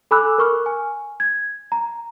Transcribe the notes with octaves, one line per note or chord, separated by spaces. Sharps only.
A4 G#5 B5 D6 E6 F#6
A#4 C#6 F6
G#5
G#6
A#5